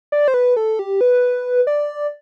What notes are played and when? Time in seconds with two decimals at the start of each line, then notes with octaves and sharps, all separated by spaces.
0.12 D5
0.28 C5
0.34 B4
0.57 A4
0.79 G4
1.01 B4
1.67 D5